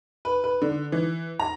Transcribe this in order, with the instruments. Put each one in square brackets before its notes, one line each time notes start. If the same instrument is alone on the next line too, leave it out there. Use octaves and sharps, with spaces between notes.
[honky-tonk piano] B4
B4
D3
E3
A#5